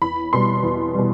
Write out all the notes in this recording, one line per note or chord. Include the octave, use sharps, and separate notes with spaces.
E2 B5
B2 G3 C6
E2
B2 G3